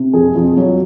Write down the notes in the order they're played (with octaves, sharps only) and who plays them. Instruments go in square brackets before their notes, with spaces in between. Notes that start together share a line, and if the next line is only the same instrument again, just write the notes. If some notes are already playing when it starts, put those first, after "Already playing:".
Already playing: [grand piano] C3
F2 G#4
F2
F#3